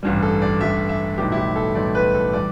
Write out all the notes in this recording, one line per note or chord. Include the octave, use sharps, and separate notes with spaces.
A1 G2 G3
A4
D5
A1 G2 G3 E5
E5
B1 A2 E3 G3 G4
E4
G4
A4
B1 A2 E3 G3 D5
B4
A4
E3 G3 D5